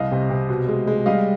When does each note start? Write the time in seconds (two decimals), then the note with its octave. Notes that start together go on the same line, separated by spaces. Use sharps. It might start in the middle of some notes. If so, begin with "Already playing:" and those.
Already playing: C2 D#5 F5
0.11 C3
0.30 C3
0.49 B2
0.68 G#3
0.87 G#3
1.06 G3 D#5 F5